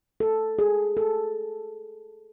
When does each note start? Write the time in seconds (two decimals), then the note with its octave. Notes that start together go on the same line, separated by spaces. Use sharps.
0.20 A4
0.59 G#4
0.97 A4